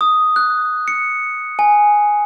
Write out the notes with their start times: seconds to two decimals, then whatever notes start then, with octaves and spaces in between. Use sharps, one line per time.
0.01 D#6
0.36 F#6
0.88 C#7
1.59 G#5